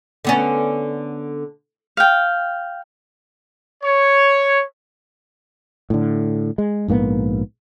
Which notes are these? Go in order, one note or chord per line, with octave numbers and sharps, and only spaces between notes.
D3 B3 C#4
F5 G5
C#5
A2 D3
G#3
A#1 G#2 A#3 B3